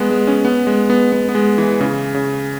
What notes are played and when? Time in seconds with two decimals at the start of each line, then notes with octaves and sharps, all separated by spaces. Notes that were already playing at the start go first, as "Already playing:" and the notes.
Already playing: G#3 B3
0.10 G#3
0.27 C#4
0.45 B3
0.67 G#3
0.90 B3
1.12 B3
1.29 B3
1.35 G#3
1.58 E3
1.81 C#3
2.14 C#3